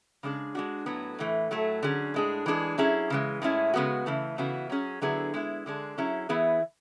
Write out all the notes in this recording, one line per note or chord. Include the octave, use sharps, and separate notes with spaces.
C#3 G#3 D4 G#4
G#3 D4 F#4
A2 F#3 B3
A2 E3 A3
A2 F#3 A3
D3 F#3 C#4 G#4
A2 G#3 D4 G#4
E3 G#3 D4 G#4
F#3 C#4 E4 G#4
C#3 E3 G#3
A2 G#3 C#4 E4
C#3 G#3 B3 F#4
C#3 E3 A3
C#3 E3 B3 F#4
F#3 C#4 G#4
D3 F#3 B3 E4 G#4
G#3 B3 E4
D3 G#3 D4 G#4
F#3 C#4 E4 G#4
E3 B3 E4 G#4